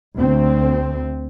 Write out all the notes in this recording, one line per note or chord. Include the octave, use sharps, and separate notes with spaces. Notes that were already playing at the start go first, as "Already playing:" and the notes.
D2 C4